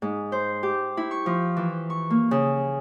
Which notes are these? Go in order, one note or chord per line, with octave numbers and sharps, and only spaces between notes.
G#2
C5
G4
E4
C#6
F3
E3
C#6
A#3
C#3